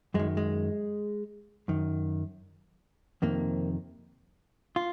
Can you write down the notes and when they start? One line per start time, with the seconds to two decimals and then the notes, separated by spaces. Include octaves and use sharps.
0.14 F#2 D#3 G#3
0.37 G#3
1.68 F#2 D#3
3.22 F2 C3 D#3 A#3
4.76 F4